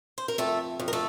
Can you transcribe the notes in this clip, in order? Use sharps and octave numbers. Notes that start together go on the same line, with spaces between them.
C5
A#4
F2 A3 A4
F2
A#4
A3 A4